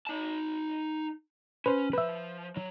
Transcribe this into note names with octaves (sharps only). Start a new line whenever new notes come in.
D#4 A5
C#4 B4 C5
F3 B4 E5
F#3